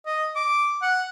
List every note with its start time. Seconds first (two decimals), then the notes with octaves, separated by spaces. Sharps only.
0.06 D#5
0.36 D6
0.82 F#5